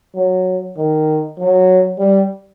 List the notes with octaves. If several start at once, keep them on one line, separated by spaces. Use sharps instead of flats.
F#3
D#3
F#3
G3